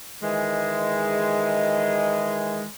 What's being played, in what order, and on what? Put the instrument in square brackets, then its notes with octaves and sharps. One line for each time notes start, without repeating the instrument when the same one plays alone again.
[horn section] D#3 E3 G#3